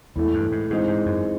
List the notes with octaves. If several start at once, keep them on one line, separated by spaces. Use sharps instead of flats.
E2 A2 E3 A3
G2
G#2
G#2 E3 G#3 C4 D#4
G#2
F#2